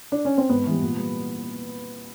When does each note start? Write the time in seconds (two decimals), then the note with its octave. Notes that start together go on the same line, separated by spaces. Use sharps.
0.12 D4
0.25 C#4
0.38 C4
0.49 G#2 B3
0.66 E3 G3
0.82 A#2
0.97 G3